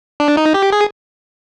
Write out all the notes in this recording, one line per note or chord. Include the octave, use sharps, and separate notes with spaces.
D4
D#4
G4
G#4